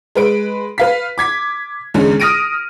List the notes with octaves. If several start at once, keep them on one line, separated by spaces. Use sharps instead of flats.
G#3 B4 D7
B4 F5 B6
D6 G#6 B6
E2 D3 G#3 C#4
D#6 F6 A#6 D7 D#7